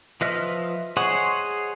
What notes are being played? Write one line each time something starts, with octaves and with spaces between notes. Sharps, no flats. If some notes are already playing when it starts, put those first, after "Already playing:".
F3 B4 D#5 E5 F6
G#4 C5 C#5 D#5 F#5